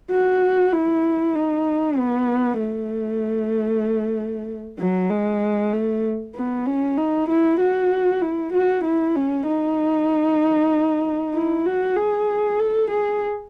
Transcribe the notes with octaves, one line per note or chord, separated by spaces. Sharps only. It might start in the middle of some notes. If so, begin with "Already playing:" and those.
F#4
E4
D#4
B3
A3
F#3
G#3
A3
B3
C#4
D#4
E4
F#4
E4
F#4
E4
C#4
D#4
E4
F#4
G#4
A4
G#4